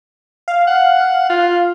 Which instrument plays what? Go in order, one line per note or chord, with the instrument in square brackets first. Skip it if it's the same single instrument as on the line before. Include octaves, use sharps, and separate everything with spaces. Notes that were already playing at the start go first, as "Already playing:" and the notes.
[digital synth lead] F5
[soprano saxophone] F#5
F4